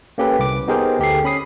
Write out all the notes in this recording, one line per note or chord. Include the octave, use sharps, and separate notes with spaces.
A#3 C#4 G4 A4 B4
C2 D6
B3 D#4 G4 G#4 A#4 C5
D2 G4 A4 C7
C#4 B5 D#6 C7